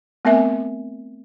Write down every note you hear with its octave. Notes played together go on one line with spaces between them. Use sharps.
A3 B3 C4 A#4 E5 G#5